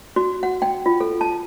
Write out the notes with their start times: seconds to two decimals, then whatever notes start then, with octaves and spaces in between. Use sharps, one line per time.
0.16 F#4
0.43 F#5
0.62 G5
0.86 F4
1.00 A4
1.21 A5